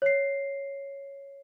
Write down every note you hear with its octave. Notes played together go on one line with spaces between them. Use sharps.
C#5 C7